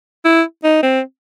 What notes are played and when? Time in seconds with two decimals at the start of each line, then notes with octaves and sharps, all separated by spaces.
0.25 E4
0.64 D#4
0.83 C4